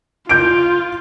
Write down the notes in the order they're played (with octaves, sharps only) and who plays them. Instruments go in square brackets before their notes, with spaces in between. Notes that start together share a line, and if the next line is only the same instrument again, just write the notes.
[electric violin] F4 [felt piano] G6 D7